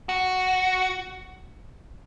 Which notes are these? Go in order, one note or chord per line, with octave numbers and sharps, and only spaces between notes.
F#4